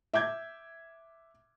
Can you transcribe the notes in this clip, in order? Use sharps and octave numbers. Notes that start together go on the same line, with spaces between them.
E5 D6 G6 G#6